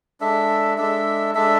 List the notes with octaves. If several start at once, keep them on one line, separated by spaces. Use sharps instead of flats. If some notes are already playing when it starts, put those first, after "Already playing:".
G#3 D4 A4 E5
G#3 D4 A4 E5
G#3 D4 A4 E5